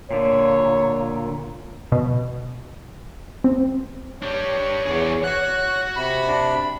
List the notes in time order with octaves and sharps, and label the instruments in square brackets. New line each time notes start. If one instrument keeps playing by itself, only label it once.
[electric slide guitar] A#2 D3 [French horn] C#5
[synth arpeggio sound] B2
C4
[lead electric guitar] D4 G4 [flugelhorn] C#5
[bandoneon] E2 [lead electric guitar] G#4 D5
[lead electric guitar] F#4 F#5 [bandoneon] F#6
[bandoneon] C3 B5
[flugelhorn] D4